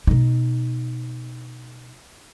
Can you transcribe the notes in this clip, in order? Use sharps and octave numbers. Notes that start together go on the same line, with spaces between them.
B2 D#4